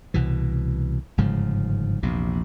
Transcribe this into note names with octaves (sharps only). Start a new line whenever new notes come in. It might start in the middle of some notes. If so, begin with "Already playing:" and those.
C2 B2 E3
G1 G#2 C#3 F3
A#1 E2 C3